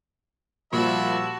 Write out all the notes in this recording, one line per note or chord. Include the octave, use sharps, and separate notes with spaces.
A#2 F3 G3 F#4 E5 A5 B5